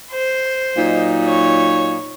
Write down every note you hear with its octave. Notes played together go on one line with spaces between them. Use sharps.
C5
A#2 F#3 D#4
C#5